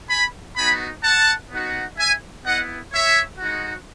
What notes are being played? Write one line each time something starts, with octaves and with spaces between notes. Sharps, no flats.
G#5 B5
B3 D#4 F#4 G#5 B5
F#5 A5
B3 D#4 F#4
E5 G#5
B3 E4 D#5 F#5
C#5 E5
G#3 D#4 F#4